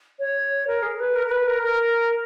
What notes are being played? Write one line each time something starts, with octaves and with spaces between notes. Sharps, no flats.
C#5
A#4
G#4
B4
A#4
A#4
B4
A#4
A#4